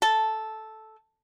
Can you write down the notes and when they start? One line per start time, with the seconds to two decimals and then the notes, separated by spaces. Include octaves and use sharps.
0.02 A4